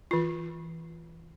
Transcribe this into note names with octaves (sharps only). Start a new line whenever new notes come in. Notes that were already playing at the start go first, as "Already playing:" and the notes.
E3 F4